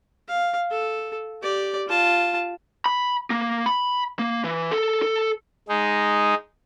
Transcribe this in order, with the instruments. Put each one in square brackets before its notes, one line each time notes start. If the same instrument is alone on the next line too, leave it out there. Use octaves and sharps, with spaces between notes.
[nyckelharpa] F5
A4
G4 D5
F4 A5
[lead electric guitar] B5
A#3
B5
A#3
E3
A4
A4
[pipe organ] G#3 D#4